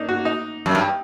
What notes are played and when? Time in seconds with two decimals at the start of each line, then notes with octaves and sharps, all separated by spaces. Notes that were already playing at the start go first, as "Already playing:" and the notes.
Already playing: A#3 D4 D#4
0.09 F#4
0.25 D#4
0.66 F#2
0.75 G2